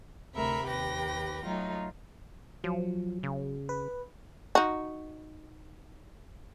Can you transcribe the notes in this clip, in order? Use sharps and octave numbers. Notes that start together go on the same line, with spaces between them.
D2 C3 A3 A#4 E5 B5
D#2 G4 B4 G5 A#6
F#3 A3 D#4 F4
F3 F#3
C#3
B4
D#4 F#4